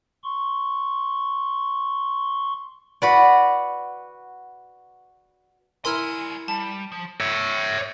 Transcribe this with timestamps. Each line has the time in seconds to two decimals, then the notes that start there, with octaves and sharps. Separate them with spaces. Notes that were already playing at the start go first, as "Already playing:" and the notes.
0.24 C6 C#6
3.02 F#4 B4 D5
5.85 G3 E4 A#4 G#5 B5 C6 E6 F6
6.48 G3 A5
6.92 F3
7.21 C#5 E5